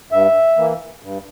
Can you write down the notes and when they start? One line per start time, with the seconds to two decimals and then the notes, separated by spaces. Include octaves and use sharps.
0.12 G2 E5
0.57 E3 A#3
1.02 G2